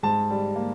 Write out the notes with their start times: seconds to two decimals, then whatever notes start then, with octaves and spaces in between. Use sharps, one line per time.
0.03 G#2 A5
0.30 G3
0.56 A#3